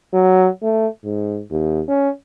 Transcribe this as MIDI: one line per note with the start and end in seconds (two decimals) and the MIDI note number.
0.13 0.48 54
0.62 0.87 57
1.04 1.41 44
1.50 1.81 39
1.88 2.10 61